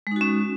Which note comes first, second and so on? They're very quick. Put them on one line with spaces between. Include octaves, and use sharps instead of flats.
G#3 D#4 F#4 C#4